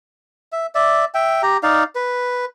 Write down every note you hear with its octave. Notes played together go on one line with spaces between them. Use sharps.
E5
D5 E5
E5 G5
G4 A#5
D#4 D5 F5
B4